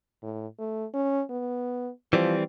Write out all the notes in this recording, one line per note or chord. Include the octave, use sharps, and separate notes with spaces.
A2
A3
C#4
B3
E3 F3 G3 C4